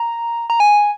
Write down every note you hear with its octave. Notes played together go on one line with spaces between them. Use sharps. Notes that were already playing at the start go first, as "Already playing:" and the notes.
Already playing: A#5
A#5
G#5